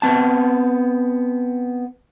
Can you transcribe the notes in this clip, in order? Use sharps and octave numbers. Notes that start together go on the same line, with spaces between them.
B3 C4 A5